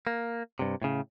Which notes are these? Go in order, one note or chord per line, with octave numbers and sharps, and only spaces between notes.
A#3
G2 C3
A2 C#3